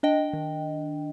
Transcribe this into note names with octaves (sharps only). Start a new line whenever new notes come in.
D4 D#5 G5
D#3